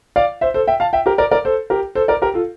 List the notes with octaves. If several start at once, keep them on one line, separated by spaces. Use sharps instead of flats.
D5 F5
C5 E5
A4 C5
E5 G5
F5 A5
E5 G5
G4 A#4
A#4 D5
A#4 D5
A4 C5
G4 A#4
A4 C5
A#4 D5
G4 A#4
F4 A4